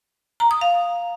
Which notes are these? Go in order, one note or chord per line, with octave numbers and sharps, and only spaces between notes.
A#5
D#6
F5